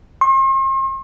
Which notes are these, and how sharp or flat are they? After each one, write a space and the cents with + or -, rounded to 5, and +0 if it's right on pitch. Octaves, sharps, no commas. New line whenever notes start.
C6 +45